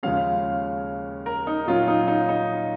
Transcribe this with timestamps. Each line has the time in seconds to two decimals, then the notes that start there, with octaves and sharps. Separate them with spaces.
0.03 D#2 C#3 F3 G#3 C#4 F5
1.26 A#4
1.47 D#4
1.67 A#2 F#3 C#4 F4
1.88 D#4
2.08 D#4
2.29 D#4